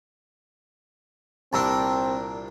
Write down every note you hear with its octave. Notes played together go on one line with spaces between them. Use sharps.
C2 A#2 C4 D4 A5 A#5 E6